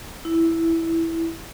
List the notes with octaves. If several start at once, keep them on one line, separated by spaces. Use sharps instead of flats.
E4